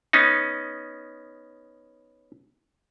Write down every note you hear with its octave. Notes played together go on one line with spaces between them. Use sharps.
B3 C#4 D#4